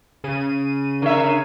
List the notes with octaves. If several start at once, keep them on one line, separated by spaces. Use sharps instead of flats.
C#3 D#7
D3 A#4 C#5 E5